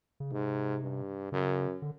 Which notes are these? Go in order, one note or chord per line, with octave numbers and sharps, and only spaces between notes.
C#3
G#2 C3
G2
F#2 C#3
D3